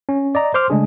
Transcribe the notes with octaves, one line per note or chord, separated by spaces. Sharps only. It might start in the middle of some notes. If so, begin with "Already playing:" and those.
C#4
D5 D#5 A#5
C5 C6 D6 F6
C#3 G#3 A3 D4 G#4